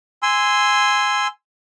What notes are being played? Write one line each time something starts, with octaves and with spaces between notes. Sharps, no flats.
G#5 C6 E6